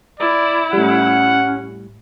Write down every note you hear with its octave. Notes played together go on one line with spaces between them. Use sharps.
E4 D5
A2 G3 C#4 F#5